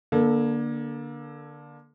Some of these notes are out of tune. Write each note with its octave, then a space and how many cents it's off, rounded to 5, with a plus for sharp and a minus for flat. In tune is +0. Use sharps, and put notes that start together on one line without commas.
D3 +0 A#3 +25 A4 +0